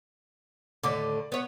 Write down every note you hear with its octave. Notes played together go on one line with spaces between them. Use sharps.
D#2 A2 D3 D5 D6
B3 C#5